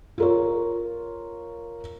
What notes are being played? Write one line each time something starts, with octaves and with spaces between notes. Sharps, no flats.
F4 A#4 C#5